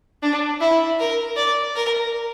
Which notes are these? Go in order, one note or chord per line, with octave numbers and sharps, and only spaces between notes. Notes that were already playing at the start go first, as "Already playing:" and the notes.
D4
E4
A#4
D5
A#4